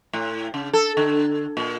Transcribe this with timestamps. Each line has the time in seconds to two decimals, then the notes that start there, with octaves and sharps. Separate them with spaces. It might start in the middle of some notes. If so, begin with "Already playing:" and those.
0.13 A2
0.54 C#3
0.73 A4
0.97 D3
1.57 A#2